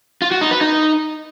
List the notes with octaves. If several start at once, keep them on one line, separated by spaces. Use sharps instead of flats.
F4
F#4
D#4
B4
D#4